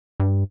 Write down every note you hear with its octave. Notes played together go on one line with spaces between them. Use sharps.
G2